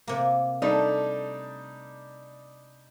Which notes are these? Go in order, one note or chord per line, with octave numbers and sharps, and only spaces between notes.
C3 A#3
G3 A3 D4 D#4